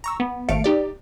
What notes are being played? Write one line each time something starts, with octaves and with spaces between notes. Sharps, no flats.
A#5 C#6 E6
B3
G#1 A3 F5 C#7 D7
D#4 G4 D5